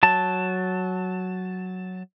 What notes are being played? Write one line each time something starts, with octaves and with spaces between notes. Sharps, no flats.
F#3 A5